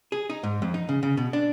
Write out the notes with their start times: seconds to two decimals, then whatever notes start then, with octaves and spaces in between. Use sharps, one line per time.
0.12 G#4
0.30 D#4
0.43 G#2
0.62 F2
0.74 D#4
0.89 C#3
1.03 C#3
1.17 B2
1.33 D4